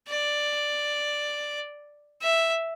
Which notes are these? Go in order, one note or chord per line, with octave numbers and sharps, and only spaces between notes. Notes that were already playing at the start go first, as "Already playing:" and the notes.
D5
E5